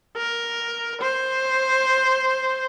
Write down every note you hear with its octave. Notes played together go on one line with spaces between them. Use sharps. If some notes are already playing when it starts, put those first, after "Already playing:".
A#4
C5